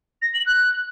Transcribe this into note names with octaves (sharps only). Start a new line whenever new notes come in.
A#6
F#7
F#6